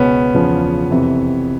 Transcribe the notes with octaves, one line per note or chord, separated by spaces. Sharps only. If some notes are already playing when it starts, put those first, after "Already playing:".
Already playing: C#2 B2 B3 C#4
E2 C#3 F3
F2 C3 E3